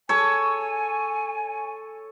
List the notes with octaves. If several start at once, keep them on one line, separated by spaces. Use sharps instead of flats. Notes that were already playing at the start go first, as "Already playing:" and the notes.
A4 C#5 G#5